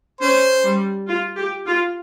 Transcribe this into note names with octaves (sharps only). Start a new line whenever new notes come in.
C#4 C5
G3
F4
G4
F4